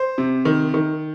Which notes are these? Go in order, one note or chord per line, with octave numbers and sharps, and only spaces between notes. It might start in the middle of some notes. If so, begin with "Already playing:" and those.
Already playing: C5
C3
D#3
D#3